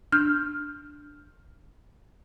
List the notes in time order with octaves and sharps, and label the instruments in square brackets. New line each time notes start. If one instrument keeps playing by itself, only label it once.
[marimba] D4 F6 G6